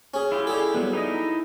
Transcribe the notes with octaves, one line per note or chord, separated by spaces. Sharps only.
C#4 G#4
E4 F4 G4
D4 G#4 A4
F#3 G3 B3
D#4 E4 D#5